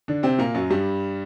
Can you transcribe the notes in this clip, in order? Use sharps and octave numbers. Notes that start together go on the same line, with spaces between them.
D3 D4
C3 C4
A#2 A#3
F#2 F#3
G2 G3